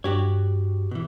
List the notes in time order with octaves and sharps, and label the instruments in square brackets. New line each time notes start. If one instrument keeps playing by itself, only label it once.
[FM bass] G2 [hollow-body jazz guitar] F#4 G4 C#5
[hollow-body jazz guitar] B2 E3